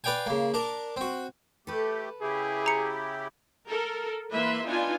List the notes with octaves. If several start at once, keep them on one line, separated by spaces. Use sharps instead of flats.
B4 D5 F5 G5 G#5
C#3 A#3
D4 A#4
C4 F#4
A3 G4 A4 B4
C#3 E4 G4 G#4
A#5 C#7
A4 A#4
E3 A#3 B4 E5 C6
B3 D4 D#4 F4 G#5